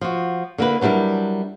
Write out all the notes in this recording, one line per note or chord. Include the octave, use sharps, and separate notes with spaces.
F3 F#4
D3 A#3 E4 B4
F#3 G3 D4 E4 A#4